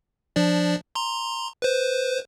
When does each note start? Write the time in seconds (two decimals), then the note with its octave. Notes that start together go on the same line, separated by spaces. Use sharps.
0.36 F3 D4 D5
0.95 A#5 C6
1.62 B4 C5